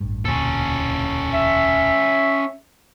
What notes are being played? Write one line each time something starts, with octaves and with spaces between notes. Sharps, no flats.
A1 G2
E1 D2 A#2 C#4 A4
E5